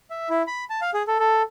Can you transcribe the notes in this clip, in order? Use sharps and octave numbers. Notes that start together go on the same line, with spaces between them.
E5
E4
B5
A5
F5
G#4
A4
A4